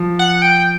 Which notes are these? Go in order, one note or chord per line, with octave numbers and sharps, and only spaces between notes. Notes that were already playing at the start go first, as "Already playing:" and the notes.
Already playing: F3
F#5
G5